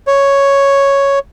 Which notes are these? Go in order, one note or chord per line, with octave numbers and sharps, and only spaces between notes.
C#5